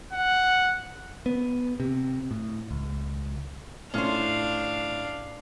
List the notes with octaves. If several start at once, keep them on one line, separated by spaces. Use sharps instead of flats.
F#5
B3
C3
A2
C#2
A2 C#4 D4 F4 C5 F5